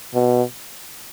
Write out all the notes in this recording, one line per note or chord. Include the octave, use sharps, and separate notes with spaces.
B2